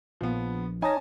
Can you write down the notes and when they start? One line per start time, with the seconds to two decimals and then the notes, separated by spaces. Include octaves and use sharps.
0.21 A#1 F3 B3
0.82 D#4 C#5 G#5 A5 A#6